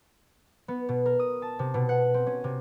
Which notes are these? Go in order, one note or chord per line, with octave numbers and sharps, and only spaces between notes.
B3
B2
A#4
D#6
A5
C3
B2
F#5
C4
C#4
C3